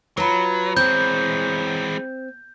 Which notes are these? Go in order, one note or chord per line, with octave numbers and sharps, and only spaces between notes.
F#3 F4 B4 C#5 A#5 B5
E3 G#3 C4 G6